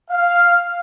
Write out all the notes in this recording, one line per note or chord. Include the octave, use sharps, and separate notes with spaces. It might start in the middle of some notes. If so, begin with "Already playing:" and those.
F5